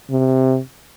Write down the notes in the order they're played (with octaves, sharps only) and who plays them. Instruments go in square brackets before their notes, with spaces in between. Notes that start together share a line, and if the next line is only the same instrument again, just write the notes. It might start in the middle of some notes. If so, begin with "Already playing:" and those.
[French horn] C3